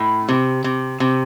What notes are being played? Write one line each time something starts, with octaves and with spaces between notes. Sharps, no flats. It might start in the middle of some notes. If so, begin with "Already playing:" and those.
Already playing: A2
C3
C3
C3